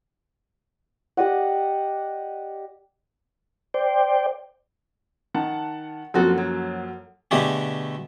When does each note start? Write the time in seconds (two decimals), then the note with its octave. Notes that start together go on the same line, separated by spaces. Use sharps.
1.17 G4 D5 D#5 F#5
3.74 C5 D5 G5
5.34 D#3 F#5 A5
6.14 F#2 F3 A#3 C4 F#4 A4
6.38 F#3
7.31 B2 D3 A3 G4 G#4